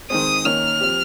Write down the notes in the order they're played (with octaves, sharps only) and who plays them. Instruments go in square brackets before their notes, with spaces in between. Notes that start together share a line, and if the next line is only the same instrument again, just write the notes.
[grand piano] D#3 G#3 C4 [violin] D#6
[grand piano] D#3 A#3 C#4 [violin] F6
[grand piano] F3 C4 G4